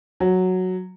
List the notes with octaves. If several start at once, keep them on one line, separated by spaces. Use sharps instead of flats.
F#3